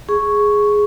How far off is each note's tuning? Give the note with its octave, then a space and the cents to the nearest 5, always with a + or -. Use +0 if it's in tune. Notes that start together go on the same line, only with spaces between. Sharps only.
G#4 +0 C#6 +0